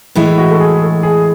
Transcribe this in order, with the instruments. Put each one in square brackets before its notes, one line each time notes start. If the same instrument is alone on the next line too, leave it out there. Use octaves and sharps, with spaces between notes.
[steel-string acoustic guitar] A2 E3 G#3 [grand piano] E4
[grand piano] F#4
A4
G#4
A4
G#4